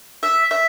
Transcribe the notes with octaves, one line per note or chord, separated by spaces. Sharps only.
E5
E5